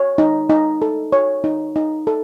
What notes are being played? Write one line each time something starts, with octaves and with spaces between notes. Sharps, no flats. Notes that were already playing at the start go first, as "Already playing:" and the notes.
Already playing: C#5
D#4
D#4
A4
C#5
D#4
D#4
A4